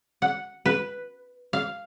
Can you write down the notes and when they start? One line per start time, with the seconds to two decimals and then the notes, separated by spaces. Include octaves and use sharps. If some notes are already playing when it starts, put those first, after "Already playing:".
0.22 F#5
0.66 B4
1.53 F5